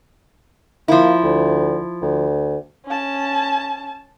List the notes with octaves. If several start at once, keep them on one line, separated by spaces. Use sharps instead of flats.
F3 A#3 E4
D2
D2
C#4 A5